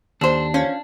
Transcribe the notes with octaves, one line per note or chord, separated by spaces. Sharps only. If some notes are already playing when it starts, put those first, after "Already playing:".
D#2 D4 A4 C5
F3 C#4